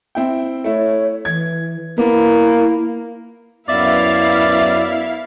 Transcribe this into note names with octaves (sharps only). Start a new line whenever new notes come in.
C4 E4 G5
A3 E4 C#5
E3 G#6
A#3 B3 E4
F#2 B3 E4 D5 E5 F5